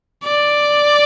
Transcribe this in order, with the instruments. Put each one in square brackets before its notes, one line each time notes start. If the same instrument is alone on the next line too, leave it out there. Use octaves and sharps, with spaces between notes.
[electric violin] D5